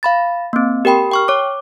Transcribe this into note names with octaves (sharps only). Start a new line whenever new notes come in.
F5 B5 A6
A#3 C4
G4 A#4 G5 B5
G5 C#6 F6
C#5 D6